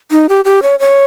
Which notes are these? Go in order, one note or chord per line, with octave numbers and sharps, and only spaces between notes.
D#4
G4
G4
C#5
C#5